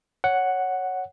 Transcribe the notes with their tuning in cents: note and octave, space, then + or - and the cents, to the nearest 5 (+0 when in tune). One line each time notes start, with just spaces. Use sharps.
C#5 +0 F#5 +0